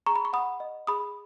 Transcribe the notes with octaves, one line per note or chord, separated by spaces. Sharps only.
G#4 A#5 C#6
B5
C#6
F#5 B5 D#6
D#5
G#4 B5 D#6